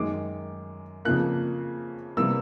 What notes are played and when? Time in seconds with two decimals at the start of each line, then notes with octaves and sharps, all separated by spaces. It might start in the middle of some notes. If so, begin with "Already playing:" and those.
Already playing: F#2 D#3 G#3 D6
1.05 F2 C#3 F3 A#3 F#6
2.17 C3 E3 G3 A#3 E6